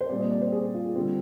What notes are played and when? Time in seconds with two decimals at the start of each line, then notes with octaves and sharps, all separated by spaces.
0.01 C5
0.09 A#2 G3 C4 D5
0.20 D#5
0.31 D5
0.41 C5
0.52 G#4
0.74 F4
0.95 D3 G3 C4 F4